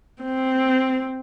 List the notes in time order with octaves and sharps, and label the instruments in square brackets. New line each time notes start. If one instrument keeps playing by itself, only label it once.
[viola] C4